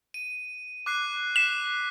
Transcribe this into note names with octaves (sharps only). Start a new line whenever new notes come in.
D#7
D6 F#6 C7
F#6 B6 C7 E7